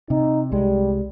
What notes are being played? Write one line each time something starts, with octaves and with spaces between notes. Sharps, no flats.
C3 D#4
C2 G3 G#3